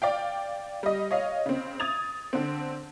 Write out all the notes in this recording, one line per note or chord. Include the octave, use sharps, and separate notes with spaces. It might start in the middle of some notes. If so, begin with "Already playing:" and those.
D5 F5 G5
G3 D#5
C#5 D#5 F5
C#3 C4
D#6 G#6 A6 F7
D3 C4